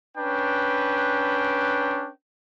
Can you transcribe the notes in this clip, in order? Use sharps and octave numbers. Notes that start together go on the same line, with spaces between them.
C#4 D4 B4 G5